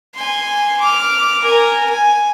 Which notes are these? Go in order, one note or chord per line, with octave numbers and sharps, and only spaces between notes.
G#5 C6
D6 F6
A#4 G#5
G#5